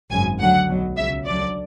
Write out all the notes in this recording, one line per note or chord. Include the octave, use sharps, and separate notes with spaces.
G#1 F#2 C#3 G#5
D2 D3 F#3 F#5
B1 B2 F#3
C#2 C#3 F#3 E5
D2 D3 F#3 D5